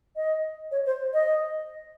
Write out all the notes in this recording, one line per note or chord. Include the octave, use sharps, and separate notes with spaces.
D#5
C#5
C5
D#5